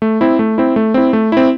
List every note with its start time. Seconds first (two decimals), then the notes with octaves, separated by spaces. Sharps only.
0.02 A3
0.21 C4 E4
0.39 A3
0.58 C4 E4
0.76 A3
0.94 C4 E4
1.13 A3
1.32 C4 E4